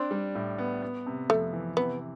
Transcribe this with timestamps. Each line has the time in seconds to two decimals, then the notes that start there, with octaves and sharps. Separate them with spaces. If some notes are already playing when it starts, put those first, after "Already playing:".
Already playing: C4 D4
0.11 G3
0.35 A2
0.58 B3
0.82 B3
1.07 C3
1.29 F2 A3
1.53 E3
1.77 C3 B3